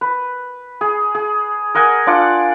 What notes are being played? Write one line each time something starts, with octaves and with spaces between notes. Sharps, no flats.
B4
G#4
G#4
A#4 D#5 F#5 G#5
D4 F4 D5 F#5